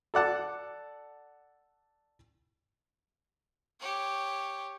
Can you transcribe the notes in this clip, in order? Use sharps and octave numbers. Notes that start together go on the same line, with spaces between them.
A4 D5 F#5 A5
G4 C#5